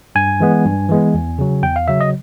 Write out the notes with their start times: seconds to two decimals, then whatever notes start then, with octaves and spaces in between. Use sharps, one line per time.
0.15 G2 G#5
0.40 E3 G#3 B3
0.65 G2
0.89 E3 G#3 B3
1.14 E2
1.39 C#3 F#3
1.63 E2 G5
1.76 F5
1.88 C#3 F#3 E5
2.01 D#5